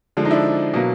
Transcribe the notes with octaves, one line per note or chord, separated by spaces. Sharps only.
D3 F3 G#3
D#4
D4 E4
B2 F#3 A#3